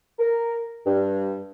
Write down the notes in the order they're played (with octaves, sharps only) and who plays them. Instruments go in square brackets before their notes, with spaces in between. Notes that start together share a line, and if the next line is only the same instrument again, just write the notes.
[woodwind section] A#4
G2